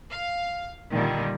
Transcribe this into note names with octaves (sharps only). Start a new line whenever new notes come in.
F5
A#2 D3 D#3 G3